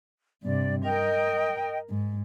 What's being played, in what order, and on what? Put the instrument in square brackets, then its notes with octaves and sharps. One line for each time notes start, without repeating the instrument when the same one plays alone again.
[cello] G2 C3 [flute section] D5
[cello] A#4 [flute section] D#5 G5
[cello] G#2